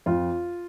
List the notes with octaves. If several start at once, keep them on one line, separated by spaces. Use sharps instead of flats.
F2 F4